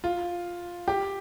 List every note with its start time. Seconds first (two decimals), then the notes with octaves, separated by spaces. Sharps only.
0.04 F4
0.88 G4